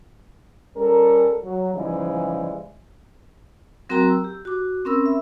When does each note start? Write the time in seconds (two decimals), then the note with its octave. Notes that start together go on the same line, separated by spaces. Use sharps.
0.76 G3 C#4 A4 A#4
1.44 F#3
1.74 G#2 C#3 E3 F3 G3 G#3
3.89 F#3 C4 F#4 A#4 G5 A#5
4.09 E6
4.24 G4
4.45 F#4 D6
4.85 C4 C#4 A#4 B5 E6
5.06 E5